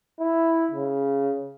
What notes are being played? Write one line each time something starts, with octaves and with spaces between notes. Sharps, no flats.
E4
C#3